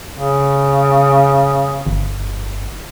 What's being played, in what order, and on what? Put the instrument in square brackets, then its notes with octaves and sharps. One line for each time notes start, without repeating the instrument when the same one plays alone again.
[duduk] C#3
[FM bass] G1